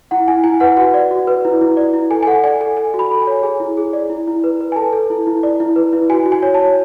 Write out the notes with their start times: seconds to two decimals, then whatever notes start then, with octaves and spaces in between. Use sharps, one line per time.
0.11 E4 F#5
0.28 E4 G#5
0.44 E4 G#5
0.60 B4 F#5
0.77 F#4 F#5
0.94 D5
1.11 F#4
1.27 B4
1.45 E4
1.61 E4
1.77 D5
1.93 E4
2.10 A4 G#5
2.23 G#5
2.27 A4 F#5
2.44 D5 G#5
2.61 A4 G#5
2.77 A4 G#5
2.94 F#4
2.99 B5
3.11 A4
3.22 G#5
3.27 C#5
3.43 G#4 G#5
3.60 E4
3.77 G#4
3.93 D5
4.10 E4
4.27 E4
4.44 B4
4.61 B4
4.72 G#5
4.76 A4 A5
4.93 A4
5.10 E4
5.27 E4
5.43 D5
5.60 E4
5.76 B4
5.93 E4
6.10 F#4 G#5
6.26 F#4
6.32 G#5
6.43 C#5
6.54 A5
6.60 C#5